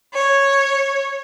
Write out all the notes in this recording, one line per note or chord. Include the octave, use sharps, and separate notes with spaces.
C#5